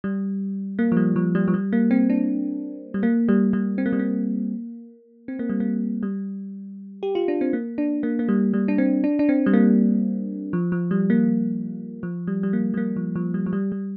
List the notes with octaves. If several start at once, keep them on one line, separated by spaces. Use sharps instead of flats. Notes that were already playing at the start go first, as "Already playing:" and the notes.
G3
A#3
F3
G3
F3
G3
F3
G3
A#3
C4
D4
G3
A#3
G3
G3
C4
A#3
G3
A#3
C4
A#3
G3
A#3
G3
G4
F4
D4
C4
A#3
D4
A#3
A#3
G3
G3
D4
C4
D4
D4
C4
G3
A#3
F3
F3
G3
A#3
F3
G3
G3
A#3
G3
A#3
F3
F3
G3
F3
G3
G3